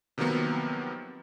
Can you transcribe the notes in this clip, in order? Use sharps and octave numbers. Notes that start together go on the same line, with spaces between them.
C3 D#3 F3 F#3 A#3 B3